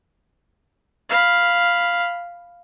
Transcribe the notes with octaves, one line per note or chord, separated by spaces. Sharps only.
F5 B5